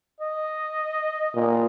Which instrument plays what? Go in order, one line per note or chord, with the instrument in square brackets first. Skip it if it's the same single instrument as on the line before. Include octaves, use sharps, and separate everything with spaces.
[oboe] D#5
[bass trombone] A#2